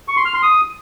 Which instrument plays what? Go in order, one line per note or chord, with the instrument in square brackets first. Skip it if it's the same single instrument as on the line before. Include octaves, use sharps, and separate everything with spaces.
[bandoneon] C#6
C6
F6
C6
D#6